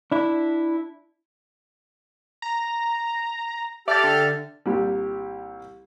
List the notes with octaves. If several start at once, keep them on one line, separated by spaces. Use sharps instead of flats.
D4 E4
A#5
G4 A4 D5 E5 F6 A6
D3
C2 A#2 G3